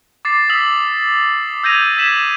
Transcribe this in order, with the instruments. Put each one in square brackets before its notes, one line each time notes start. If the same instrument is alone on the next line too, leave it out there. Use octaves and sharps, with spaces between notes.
[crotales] D6 A6 C7
D#6 E6 B6 F#7
E6 G6 G#6 A#6 D#7 F7
E6 G#6 B6 E7 F#7